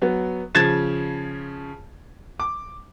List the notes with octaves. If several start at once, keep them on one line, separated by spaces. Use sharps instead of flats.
F#3 B3
C#3 F3 G#6 A6 E7
D6